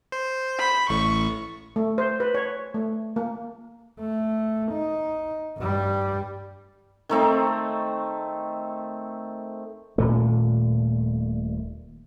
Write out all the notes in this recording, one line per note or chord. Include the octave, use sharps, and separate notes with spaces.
C5
B5
A1 A2 C#6
A3
C5
B4
C#5
A3
A#3
A3
D#4
G2 G3
D#3 A3 C4 D#4
D#1 A#2 A3